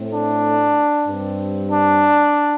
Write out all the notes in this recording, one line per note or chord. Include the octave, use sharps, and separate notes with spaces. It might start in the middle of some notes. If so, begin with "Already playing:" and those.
Already playing: A2 A3 C4
D4
G2 G3 C4
D4